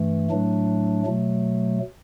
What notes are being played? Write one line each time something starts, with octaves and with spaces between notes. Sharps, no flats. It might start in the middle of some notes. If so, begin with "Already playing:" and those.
Already playing: G2 E3 A3
A2 F#3 A3 D4
B2 F#3 A3